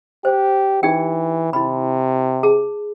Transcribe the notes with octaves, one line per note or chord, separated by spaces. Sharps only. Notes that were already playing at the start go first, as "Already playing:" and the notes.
G4 C5
E3 D#4 G4 G5
C3 E4 B5
G#4 A5